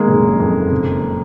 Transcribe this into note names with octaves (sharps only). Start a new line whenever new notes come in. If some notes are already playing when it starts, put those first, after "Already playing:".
Already playing: D#3 G#3 A#3
F#1
F2
F#1